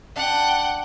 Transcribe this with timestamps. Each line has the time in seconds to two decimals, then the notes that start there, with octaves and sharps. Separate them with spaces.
0.16 D4 F#5 G5